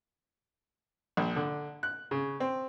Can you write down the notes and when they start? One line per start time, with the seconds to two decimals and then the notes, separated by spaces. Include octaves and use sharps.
1.17 A#1
1.36 D3
1.83 F#6
2.11 C#3
2.40 C4